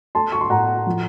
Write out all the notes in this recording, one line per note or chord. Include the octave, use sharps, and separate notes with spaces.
A3 A5 C6
C#6
C6
A2 F#5 A#5
F3